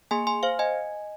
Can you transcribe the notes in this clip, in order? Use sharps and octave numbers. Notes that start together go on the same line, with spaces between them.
A#3 G#4 G#5 C6
G#5 C6
C5 F5
D#5 G#5